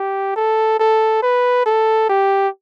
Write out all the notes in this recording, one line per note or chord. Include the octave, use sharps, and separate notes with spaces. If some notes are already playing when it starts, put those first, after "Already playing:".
Already playing: G4
A4
A4
B4
A4
G4